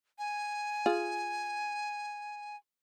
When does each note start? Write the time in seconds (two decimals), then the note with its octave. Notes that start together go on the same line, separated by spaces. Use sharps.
0.19 G#5
0.86 F4 G#4